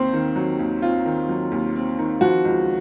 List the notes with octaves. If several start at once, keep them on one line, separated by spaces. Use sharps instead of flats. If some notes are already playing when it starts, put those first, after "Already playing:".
Already playing: D#2 C4 C5
D#3
F#3
D#2
C4 F4
D#3
F#3
D#2
C4
D#3
F3 F#4
C#2